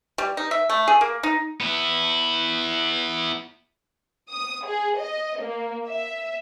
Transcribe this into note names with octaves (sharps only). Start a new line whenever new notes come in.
G3
D#4
E5
A3
G#4
A#3
D#4
B3 E4
D#6
G#4
D#5
A#3
E5